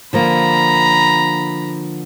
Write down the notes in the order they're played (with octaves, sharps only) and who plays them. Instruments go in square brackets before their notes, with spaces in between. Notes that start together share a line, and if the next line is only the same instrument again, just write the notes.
[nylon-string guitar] D3 F3 A#3 [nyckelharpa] A#5 B5